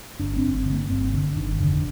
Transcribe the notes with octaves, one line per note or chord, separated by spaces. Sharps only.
G1 D4
C4
G1
C4
D3
A#3
G1 C4
G1 D3
G1 D#3
F1 D3